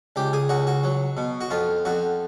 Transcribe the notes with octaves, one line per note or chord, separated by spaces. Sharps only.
C#2 G4
G#4
C#2 F#4
F#4
F#3
B2
F#4
F2 F4
F2 F#4